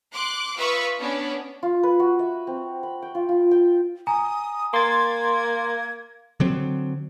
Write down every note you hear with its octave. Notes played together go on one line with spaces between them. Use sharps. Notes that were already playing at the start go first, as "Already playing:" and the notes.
C6 D6 F#6
F4 B4 E5 F5 C#6 D#6
B3 C#4 D4
F4
B4
F#4
E5
C4
B5
G5
F4
F4
G5
G#5 A#5 D#6
A#3 C6 G#6 A6
D3 F#3 C4